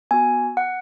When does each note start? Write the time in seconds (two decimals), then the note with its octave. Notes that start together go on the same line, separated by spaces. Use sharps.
0.11 B3 F#4 G#5
0.57 F#5